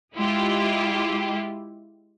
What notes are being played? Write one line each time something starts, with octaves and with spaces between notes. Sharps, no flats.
G#3 E4 F4 G4